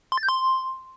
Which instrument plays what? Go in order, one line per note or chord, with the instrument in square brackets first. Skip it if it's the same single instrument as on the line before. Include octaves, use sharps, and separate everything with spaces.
[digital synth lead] C6
A6
G6
C6